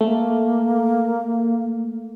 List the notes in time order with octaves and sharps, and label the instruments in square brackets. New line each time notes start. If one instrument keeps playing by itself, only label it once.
[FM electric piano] A3 [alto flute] A#3